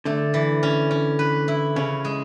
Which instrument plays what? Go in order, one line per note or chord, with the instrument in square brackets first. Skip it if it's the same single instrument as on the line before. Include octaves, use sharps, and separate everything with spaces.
[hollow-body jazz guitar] D3 [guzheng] A3
[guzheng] E3
C#4
C#4
B4
E4
[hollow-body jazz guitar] C#3 [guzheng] C#4
[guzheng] G#3